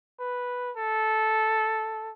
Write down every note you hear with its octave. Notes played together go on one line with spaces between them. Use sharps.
B4
A4